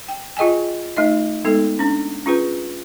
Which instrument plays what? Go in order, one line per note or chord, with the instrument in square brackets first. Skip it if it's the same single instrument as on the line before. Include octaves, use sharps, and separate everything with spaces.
[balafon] G5
F4 G#4 D#5 G5 G#5
A3 D#4 D#5
G#3 B3 D#4 A4
C#4 D4
C#4 F4 G#4 B4